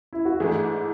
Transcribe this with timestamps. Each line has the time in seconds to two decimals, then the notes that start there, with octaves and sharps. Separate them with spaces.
0.13 E4
0.25 F#4
0.40 G#2 E3 A3 D4 G#4